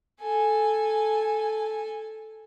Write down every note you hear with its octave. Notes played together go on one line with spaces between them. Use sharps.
A4 G#5